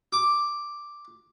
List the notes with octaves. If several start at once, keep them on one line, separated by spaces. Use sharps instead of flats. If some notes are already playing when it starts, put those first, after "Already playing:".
D6